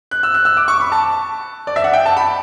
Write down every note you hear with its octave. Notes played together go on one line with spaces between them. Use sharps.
F#6
E6
F#6
E6
D6
C#6
B5
A5
D5
E5
F#5
G5
A5
B5